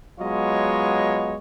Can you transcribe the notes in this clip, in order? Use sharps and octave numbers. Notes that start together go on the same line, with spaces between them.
F#3 G#3 B3 F4 C#5 D#5